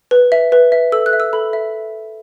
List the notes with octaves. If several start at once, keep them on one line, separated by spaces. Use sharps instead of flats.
B4
E5
B4
E5
A4 E6
F#6
E5
E6
A4 B5
E5